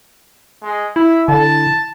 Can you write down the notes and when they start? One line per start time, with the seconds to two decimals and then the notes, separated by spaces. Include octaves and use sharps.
0.62 G#3
0.96 E4 E5
1.28 D3 A5